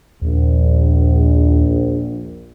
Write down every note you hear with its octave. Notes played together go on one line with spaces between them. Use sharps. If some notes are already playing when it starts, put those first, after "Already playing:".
A#1 D#2